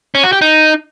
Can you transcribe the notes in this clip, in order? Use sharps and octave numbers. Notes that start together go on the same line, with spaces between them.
C#4
F#4
G4
D#4